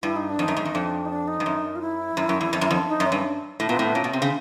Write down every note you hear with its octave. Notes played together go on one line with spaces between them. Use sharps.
G2 E4
D#4
D4
F2
F#2 D#4
G#2
E2
F2 D4
D#4
D4
D#4
G2
F#2
F4
E4
F#2
F#2
E2
F2
F#2
F2
D#4
F#2
C#4
G2
A2
A#2 B3
A2 C4
B3
A#2 C#4
B2
C3 C4
C#3